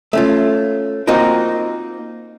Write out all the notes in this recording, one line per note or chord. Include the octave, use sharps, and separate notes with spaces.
A3 C#4 F4
A#3 C4 D#4 F4 F#4 A#4